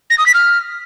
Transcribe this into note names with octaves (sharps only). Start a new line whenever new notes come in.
A#6
D#6
B6
F6